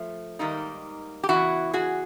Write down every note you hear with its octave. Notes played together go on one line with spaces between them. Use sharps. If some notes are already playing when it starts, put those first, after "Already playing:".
Already playing: F3 A3
G#2 D#3 G3 A#3 D#4
G4
E2 C#3 E3 E4 F#4
F#4 G#4